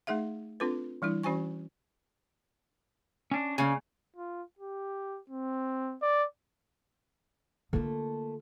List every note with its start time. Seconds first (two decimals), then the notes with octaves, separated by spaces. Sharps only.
0.07 A3 D#4 G#4 E5 F5
0.60 C4 D4 F4 A4 B4
1.02 E3 G3 D4 E4
1.23 E3 C#4 F#4 C5 G#5 C#6
3.31 C#4 D4
3.58 C#3 A#3 F5 G#5
4.16 F4
4.59 G4
5.30 C4
6.02 D5
7.73 D3 A3 A#3 F4 A4